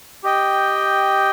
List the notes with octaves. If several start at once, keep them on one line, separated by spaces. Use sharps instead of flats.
G4 D#5 G5